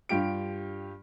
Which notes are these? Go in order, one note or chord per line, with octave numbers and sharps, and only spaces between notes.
G2 F4 G4 D7